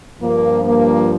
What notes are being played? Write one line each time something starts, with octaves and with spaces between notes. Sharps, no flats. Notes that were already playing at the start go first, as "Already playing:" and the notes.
G2 F3 A#3
A#3